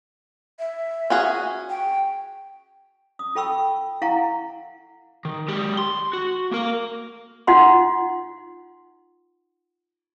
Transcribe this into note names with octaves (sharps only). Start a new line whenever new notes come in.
E5
C#4 F#4 G#4
G5
D#6
F4 A4 G5 B5 C#6 E6
E4 F5 F#5 G#5 A#5 C#6
D#3
G#3 G4
C6
F#4
A#3 A#4
D#4 F4 F#5 C6